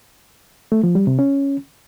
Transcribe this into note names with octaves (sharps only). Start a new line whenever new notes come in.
A3
F3
G3
C3
C#4